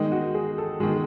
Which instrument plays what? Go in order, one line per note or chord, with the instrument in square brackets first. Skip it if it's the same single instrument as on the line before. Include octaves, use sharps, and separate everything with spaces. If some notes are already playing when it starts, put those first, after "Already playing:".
Already playing: [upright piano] D#3 G#3 D#4
F#4
G#4
A4
D#3 G#3 G#4